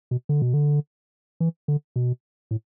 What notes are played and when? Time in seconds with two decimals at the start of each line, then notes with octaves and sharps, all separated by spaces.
0.11 B2
0.29 D3
0.42 B2
0.54 D3
1.40 E3
1.68 D3
1.96 B2
2.51 A2